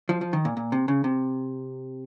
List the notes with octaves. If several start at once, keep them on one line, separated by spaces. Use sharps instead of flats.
F3
F3
D#3
A#2
A#2
C3
C#3
C3